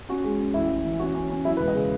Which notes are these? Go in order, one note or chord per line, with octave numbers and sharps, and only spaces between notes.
C#4 F#4
G#3
C#4
A1 E4
A1
E3
C#4 F#4
C#4
C#4
F#3 E4
B4
E1
D#5
C#3